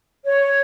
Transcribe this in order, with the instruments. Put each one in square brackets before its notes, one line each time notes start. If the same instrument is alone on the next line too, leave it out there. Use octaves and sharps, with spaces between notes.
[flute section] C#5